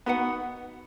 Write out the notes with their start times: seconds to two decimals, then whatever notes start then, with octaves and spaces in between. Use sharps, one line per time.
0.06 B3 D#4 F#4 B4 F#5